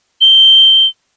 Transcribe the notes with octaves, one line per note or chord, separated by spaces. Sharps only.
G7